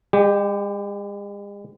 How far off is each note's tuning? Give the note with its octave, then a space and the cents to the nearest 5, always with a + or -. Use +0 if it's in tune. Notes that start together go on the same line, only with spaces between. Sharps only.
G#3 -45 G4 +5